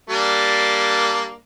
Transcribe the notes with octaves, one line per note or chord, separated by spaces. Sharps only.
G3 A#3 D4